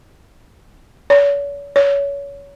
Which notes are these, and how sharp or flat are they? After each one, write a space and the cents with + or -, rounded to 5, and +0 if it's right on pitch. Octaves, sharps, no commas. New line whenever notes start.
C#5 +40
C#5 +25